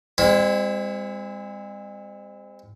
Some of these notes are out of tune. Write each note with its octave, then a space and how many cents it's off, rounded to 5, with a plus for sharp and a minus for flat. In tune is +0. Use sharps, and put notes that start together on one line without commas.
G#3 -45 C4 -10 E4 +0